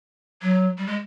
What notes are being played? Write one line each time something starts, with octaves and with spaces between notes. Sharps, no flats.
F#3
G3
G#3